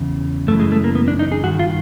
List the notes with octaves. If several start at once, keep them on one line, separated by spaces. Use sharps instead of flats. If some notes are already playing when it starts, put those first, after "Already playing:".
Already playing: E2 C#3
F#2 C#3 E3 A3
G#3
A3
A#3
B3
D4
D#4
G#4
G2 D#3 F#4
F4